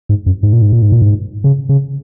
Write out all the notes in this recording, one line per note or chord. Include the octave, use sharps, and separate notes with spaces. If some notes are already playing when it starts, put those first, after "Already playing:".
G#2
F#2
G#2
A#2
G#2
A#2
G#2
A#2
G#2
C#3
C#3